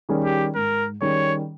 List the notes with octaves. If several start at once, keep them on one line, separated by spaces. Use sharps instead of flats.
D#3 G3 C#4 G#4
G4
G#2 A#4
D#3 G3 C#4 G#4 C#5